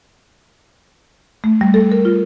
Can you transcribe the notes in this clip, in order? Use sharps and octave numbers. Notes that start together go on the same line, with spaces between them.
A3
G3
A4
A#4
F4